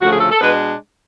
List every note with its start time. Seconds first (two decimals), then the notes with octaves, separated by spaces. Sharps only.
0.01 D2 C#3 F3 A3 F#4
0.11 G#4
0.20 A4
0.31 A4
0.41 B2 G#3 D4 B4